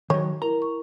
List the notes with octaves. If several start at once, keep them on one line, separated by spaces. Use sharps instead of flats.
D#3 F#3 C#5
E4 A#4 A#5
C#6